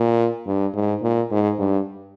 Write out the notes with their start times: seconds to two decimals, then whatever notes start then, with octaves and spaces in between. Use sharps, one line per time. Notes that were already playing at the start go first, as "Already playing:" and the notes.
Already playing: A#2
0.47 G2
0.74 G#2
1.03 A#2
1.31 G#2
1.59 G2